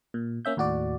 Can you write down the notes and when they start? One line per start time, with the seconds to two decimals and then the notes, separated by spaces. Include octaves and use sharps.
0.14 A#2
0.45 A#3 C#4 E5 G6
0.57 D#2 A2 F#4 D5